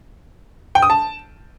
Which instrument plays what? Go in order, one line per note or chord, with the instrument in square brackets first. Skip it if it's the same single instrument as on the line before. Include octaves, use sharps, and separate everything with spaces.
[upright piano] G5
D#6
A5